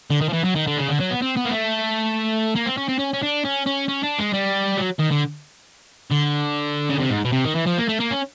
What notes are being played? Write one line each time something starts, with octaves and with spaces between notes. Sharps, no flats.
D3
D#3
F3
E3
F#3
D#3
D3
C#3
D3
F#3
B3
C4
B3
A#3
A3
A#3
C4
C#4
C4
C#4
C#4
D4
C#4
C#4
C#4
D4
G#3
G3
F#3
D#3
D3
D3
C#3
C3
G#2
B2
C3
D#3
E3
F3
A#3
A3
A#3
C#4